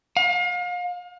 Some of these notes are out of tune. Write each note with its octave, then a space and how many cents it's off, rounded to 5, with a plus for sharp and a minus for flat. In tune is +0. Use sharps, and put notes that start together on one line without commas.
F5 +35